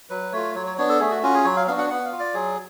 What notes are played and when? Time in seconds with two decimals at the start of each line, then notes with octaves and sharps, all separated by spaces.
0.10 F#3 B4
0.32 A3 F4 C#5
0.55 F#3 C#5
0.66 C#5
0.78 B3 D4 C#5
0.89 A4
1.00 A3 G#4
1.11 F#4
1.23 C#4 F4 F#4
1.34 G#4
1.44 F#3 C#5
1.56 F5
1.67 B3 D4 F#4 F5
1.78 F#5
1.90 B3 F#5
2.05 F5
2.12 F4
2.20 D5
2.34 F#3 G#4